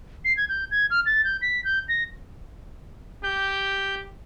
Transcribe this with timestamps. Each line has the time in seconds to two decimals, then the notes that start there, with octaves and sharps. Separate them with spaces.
0.25 C7
0.37 G#6
0.49 G6
0.71 G#6
0.91 F6
1.06 A6
1.24 G6
1.42 B6
1.65 G6
1.89 A#6
3.24 G4 G6